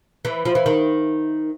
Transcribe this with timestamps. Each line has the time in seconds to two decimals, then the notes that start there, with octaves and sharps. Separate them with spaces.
0.25 E3
0.45 F3
0.55 E3
0.66 D#3